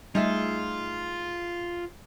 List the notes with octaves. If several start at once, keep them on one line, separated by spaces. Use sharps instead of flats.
G3 A3 D#4 F4 G#4 E5